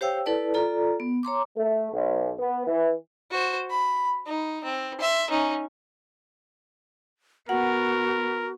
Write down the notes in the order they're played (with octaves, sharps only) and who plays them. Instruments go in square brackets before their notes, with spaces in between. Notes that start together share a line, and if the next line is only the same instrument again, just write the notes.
[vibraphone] G4 C5 C#5 F5 G5 E6
E4 A4 B4 D5 A5
F4 A4 D5 A#5
B3
C#5 A#5 C6 D6
[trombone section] A3
B1
B3
E3
[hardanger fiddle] F#4 C5
B5
D#4
C4
E5 C6
C#4 D#4
[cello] B3 [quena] F#4 [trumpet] A#4 [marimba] F#5